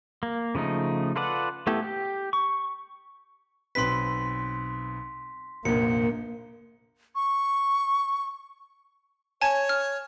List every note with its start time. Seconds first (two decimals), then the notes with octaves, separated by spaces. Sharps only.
0.23 A#3
0.55 C#3 F3 A3 D#4
1.16 F4 A4 B4 D5 F#5
1.67 A3 B3 E4 G4 A4
1.82 G4
2.33 C#6
3.75 B1 C4 B4 C6 B6
5.65 F1 A#1 A#3 C#7
7.15 C#6
9.41 C#5 G#5 A5 G#6
9.69 F6